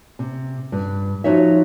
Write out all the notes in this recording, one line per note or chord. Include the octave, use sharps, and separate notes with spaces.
C3
G2
F3 D#4 F#4 C#5 E5